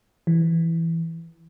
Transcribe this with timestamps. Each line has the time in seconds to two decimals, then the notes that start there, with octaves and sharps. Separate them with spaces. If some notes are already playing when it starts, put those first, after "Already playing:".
0.27 E3